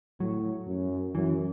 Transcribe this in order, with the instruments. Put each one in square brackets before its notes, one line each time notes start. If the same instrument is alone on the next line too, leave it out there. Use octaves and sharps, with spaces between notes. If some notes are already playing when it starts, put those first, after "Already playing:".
[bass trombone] A2 [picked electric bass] F#3
[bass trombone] F#2
[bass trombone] F#2 [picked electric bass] E3